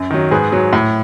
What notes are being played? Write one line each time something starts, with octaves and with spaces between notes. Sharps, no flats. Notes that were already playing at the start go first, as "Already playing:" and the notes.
Already playing: F#2
D#3 F#3
G#2 G#4 B4
F#3
A2